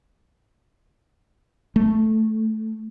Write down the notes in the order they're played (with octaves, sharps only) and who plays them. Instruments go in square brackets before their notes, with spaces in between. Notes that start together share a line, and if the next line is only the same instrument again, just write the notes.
[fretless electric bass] A3